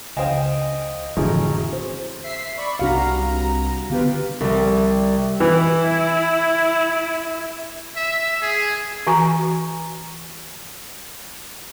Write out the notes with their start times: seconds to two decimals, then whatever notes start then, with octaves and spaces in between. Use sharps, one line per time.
0.17 C#2 C5 D#5 F5 G5 G#5 D#6
1.17 A1 F2 D3 F#4 G#4 A#5
1.73 C5
2.24 E5 B6 C7
2.57 D5 B5 C#6
2.79 C2 C3 D4 F#4 F5 A#5
3.90 D3 B3 F4 G4 B4
4.40 C2 G3
5.40 E3 E4
7.96 E5
8.42 G#4
9.07 E3 F#4 G#5 A#5